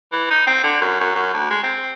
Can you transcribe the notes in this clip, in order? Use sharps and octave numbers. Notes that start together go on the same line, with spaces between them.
E3
D#4
C4
D3
F#2
F#2
F#2
D2
G#3
C4